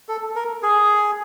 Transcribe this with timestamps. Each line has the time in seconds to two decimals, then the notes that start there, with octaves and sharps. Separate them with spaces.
0.08 A4
0.36 A#4
0.63 G#4